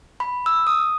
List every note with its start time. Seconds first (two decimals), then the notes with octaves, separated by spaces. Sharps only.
0.20 B5
0.46 E6
0.67 D#6